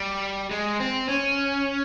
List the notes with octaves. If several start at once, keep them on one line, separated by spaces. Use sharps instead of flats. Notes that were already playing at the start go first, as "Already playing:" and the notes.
Already playing: G3
G#3
C4
C#4